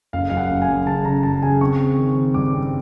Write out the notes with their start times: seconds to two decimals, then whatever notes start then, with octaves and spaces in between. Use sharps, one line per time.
0.13 F#1 F5
0.30 F#2 F5
0.37 F#5
0.50 F#1
0.62 G#5
0.68 F#2
0.86 C#3 A5
1.05 C#3 A#5
1.23 F#2 A5
1.42 C#3 G#5
1.61 C4 C#6
1.80 C4
1.98 D#3
2.16 C4
2.34 G2 D6
2.53 C4